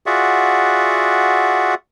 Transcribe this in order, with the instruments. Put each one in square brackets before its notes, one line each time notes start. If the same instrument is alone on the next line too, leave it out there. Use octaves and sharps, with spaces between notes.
[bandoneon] F4 F#4 G#4 D5 E5 F#5